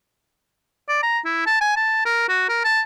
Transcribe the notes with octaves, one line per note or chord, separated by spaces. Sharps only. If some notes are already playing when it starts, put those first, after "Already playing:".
D5
A#5
E4
A5
G#5
A5
A#4
F#4
A#4
A5